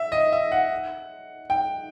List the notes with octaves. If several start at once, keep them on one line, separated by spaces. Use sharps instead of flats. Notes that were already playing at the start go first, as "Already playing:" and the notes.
Already playing: E5
D#5
E5
F#5
G5